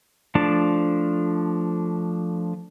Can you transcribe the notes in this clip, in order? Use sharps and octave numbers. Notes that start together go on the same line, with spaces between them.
F3 A3 D4 A5